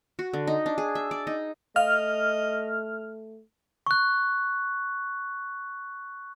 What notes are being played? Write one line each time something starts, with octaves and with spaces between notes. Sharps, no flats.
F#4
D3
D#4
D4
G#4
E5
D5
D#4
A3 D#5 F5 F6
C#6 F#6